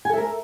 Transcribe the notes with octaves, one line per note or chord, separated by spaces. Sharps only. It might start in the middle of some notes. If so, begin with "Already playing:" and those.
A4 A#4 E5 G#5